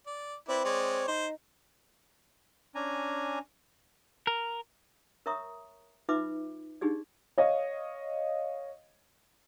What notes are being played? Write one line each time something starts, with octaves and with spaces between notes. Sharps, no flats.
D5
C4 E4 B4 D5
G#3 C#5 D5
D#4 C5
C#4 D4 G#5 A#5
A#4
A#4 C#5 E5 A#5 C#6 D#6
D#4 F4 B4 E5 B5 D6
D4 D#4 G4 G#4 D5
C#5 D#5 F5